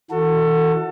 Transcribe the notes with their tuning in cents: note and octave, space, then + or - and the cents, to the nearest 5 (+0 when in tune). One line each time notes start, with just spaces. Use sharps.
E3 -35 F#4 -15 A4 +25